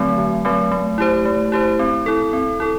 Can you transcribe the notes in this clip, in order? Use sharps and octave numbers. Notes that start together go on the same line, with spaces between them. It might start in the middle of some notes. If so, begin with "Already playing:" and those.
Already playing: D3 F#3 A3 C4
D3
F#3 A3 C4
A3
E4 G4 C5
A3
E4 G4 C5
C4
E4 A4
C4
E4 A4